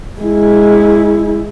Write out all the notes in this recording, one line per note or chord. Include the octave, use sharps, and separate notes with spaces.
G#3 E4